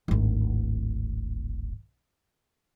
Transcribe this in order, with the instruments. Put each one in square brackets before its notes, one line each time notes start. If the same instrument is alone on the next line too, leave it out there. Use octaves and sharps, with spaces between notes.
[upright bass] D1 G#1